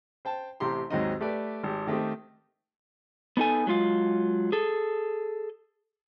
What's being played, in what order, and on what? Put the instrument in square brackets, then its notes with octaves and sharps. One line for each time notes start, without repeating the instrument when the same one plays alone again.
[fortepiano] C5 G5 A5
A1 C3 G4 A#5 C6
D#2 G#2 F#3 C4 D#4 D#5
A3 G4 B4 D5
G#1 G4
D#3 A3 C4 D#4 G4
[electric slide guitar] B3 D4 D#4 A4 G#5
F#3 G#3 F4 F5
G#4 A4